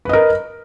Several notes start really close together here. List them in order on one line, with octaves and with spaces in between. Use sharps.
B4 D#5 A#4